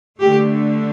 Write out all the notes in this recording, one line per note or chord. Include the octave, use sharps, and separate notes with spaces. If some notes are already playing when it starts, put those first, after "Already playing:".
D3 A3 G4